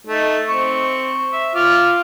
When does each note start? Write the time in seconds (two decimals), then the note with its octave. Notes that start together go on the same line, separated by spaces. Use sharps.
0.07 A3 D#4
0.49 C4 C#6
1.31 E5
1.54 F4 D6 F6